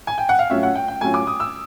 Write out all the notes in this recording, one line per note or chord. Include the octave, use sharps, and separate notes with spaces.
G#5
G5
F#5
F5
A2 F#3 A3 C#4 F4 E5
F#5
G5
G5
A2 F#3 A3 C#4 F4 G#5
D6
D#6
E6